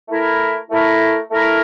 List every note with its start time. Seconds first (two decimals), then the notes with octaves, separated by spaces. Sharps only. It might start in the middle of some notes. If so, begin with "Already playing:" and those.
0.08 A3 E4 A#4
0.70 A3 E4 A#4
1.31 A3 E4 A#4